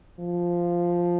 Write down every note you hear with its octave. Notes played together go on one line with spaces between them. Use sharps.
F3